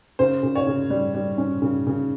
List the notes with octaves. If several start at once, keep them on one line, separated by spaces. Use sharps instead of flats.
C#3 C5
C#3
C#5
C#3
G3
G3
C#4
C#3
C#3